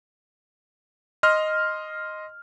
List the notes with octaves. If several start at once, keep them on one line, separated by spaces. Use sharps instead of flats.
D#5 C6 F6